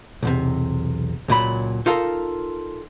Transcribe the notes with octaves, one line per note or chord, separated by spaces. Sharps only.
B1 E2 C3
C#2 A#2 F#3 B5
D#4 F4 A4 A#4